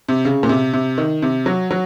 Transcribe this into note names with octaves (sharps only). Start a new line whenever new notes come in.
C3
C#3
A#2
C3
C3
D#3
C3
F#3
F#3